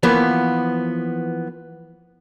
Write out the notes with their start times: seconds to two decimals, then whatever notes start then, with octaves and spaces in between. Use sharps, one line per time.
0.03 E3 F3 A#3 B3